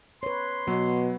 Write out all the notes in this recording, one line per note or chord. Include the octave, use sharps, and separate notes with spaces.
B4 C#5 C6
B2 F#3 B3